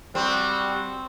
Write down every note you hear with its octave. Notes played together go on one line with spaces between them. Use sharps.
G3 C4 F#4